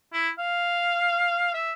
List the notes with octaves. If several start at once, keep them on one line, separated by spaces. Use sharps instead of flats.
E4
F5
E5